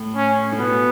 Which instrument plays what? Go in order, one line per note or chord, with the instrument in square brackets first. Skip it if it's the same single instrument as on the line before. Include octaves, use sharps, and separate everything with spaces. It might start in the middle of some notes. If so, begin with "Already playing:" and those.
Already playing: [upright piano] A2
[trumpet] C#4
[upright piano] A2
[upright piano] B2 [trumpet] B3